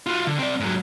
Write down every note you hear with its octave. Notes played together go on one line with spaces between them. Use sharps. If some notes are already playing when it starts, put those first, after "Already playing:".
F4 F#4
D3
C4 D5
G#2 F#3